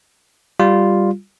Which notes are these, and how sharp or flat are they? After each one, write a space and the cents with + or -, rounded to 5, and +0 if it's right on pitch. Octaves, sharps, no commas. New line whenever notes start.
G3 +0 F4 +0